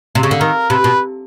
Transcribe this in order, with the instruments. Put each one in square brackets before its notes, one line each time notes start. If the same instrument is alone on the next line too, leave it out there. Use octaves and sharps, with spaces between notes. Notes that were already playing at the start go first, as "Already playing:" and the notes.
[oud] C3
C#3
D3
[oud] D#3 [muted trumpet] A#4
[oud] C3 [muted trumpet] B4
[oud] B2